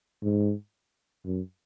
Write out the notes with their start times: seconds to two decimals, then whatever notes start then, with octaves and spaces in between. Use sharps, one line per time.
0.22 G#2
1.25 F#2